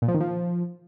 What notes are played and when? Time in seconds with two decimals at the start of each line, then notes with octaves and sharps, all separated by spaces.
0.02 A#2
0.08 F3
0.14 D#3
0.21 F3